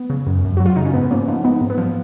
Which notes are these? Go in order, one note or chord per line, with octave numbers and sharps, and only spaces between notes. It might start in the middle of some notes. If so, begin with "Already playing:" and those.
Already playing: B3
C#3
F#2
F#2
F#3 F#4
F4
C#3 D#4
C#4
G#2 B3
F3 A#3 C#4
F3 B3 D#4
G#2 B3 D#4
G#2
B3
F3